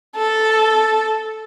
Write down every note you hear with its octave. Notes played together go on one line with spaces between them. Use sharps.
A4